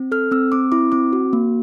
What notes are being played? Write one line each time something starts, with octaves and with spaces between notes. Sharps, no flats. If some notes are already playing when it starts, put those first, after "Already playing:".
Already playing: C4
A4 F6
C4 E6
C4 D6
E4 D6
C4 D6
F#4
A#3